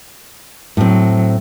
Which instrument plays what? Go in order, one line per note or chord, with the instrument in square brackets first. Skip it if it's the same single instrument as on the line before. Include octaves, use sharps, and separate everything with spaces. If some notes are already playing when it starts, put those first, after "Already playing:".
[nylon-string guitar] A2 C4 [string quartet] F#3